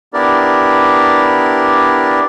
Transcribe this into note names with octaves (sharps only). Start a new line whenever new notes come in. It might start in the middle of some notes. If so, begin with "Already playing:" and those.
B3 D4 E4 G4 A#4 D5